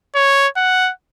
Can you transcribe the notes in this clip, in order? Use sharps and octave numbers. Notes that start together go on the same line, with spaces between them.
C#5
F#5